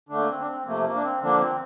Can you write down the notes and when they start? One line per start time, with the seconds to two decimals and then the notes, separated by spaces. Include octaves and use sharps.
0.09 D3 A3 D4
0.18 A#3
0.28 C4
0.40 D4
0.47 C4
0.65 C3 F3 A3 A#3
0.84 A#3
0.94 D4
1.03 C4
1.21 D3 F3 A#3 D4
1.40 C4